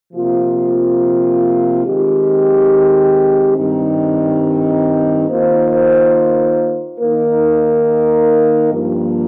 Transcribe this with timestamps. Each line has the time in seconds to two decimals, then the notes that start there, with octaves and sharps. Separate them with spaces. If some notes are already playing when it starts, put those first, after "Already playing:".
0.13 C3 F3 A#3 F4
1.84 D#3 G#3 C4 G4
3.57 G2 D#3 G3 C4 D#4
5.28 D#3 A#3 F4 C5
7.00 D#3 A#3 D#4 A#4
8.72 G2 F3 A#3